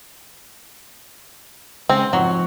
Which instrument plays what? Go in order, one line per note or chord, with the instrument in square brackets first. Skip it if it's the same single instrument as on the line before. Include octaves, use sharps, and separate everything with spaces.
[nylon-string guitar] C#3 G#3 [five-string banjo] C4 [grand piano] G5
[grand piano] F2 F#5 C#6 [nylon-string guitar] G#2 [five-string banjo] F#3